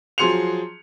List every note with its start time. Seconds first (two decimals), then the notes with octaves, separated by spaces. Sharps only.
0.18 F3 F#3 G#4 C6 C#7 F7